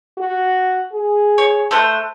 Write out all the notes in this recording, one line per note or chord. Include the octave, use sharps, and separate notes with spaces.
F#4
G#4
C#5
A3 C5 F#6